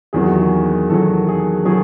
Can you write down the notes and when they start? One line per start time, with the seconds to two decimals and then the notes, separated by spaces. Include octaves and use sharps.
0.13 E2 D#3 F#3 G#4
0.27 F#4
0.39 G#4
0.90 E2 D#3 F#3 A4
1.28 G#4
1.65 D#3 F#3 G#4